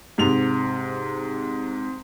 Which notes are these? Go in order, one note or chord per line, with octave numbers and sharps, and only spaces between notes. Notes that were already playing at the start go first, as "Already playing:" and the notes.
G#2 C3 F7